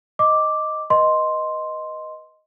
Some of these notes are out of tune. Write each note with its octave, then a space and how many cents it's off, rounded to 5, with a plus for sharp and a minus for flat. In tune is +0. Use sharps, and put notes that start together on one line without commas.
D#5 +0 D6 +0
B4 -20 D#5 +0 C6 +0